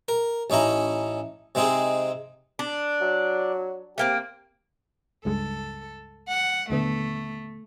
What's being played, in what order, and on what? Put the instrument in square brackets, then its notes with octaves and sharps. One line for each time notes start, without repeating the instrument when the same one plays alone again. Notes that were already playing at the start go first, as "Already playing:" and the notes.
[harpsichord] A#4
A1 C#4 D#4 E4 A#5
C3 G#3 C4 D#4 G#4
[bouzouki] D4
[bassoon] F#3
[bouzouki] A3 A#3 C4 [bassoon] G4
[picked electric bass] C#2 G2 G#3 [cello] A4
[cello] F#5
[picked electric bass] D#1 D3 B3 [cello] A3